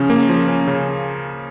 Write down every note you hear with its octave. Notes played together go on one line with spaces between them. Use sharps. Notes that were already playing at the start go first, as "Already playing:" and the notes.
Already playing: C#3 F3 C#4
A#3
F3
C#4
C#3